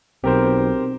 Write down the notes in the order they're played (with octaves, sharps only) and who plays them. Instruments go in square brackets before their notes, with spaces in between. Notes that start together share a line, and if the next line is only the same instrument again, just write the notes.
[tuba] B1 [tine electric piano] C4 [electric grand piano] G4 A#4 C5